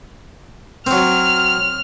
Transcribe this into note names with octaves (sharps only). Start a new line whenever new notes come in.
F#3 C4 F6